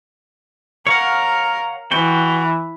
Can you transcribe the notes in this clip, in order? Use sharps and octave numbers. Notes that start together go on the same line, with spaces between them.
A#4 C#5 F5 F#5
E3 F#4 G5